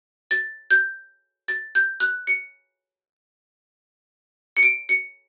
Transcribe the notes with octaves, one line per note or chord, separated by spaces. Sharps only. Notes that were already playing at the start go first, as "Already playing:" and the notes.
A6
G6
A6
G6
F#6
C#7
C#7
D7
C#7